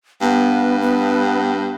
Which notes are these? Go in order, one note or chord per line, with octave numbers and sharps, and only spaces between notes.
G2 B3
B3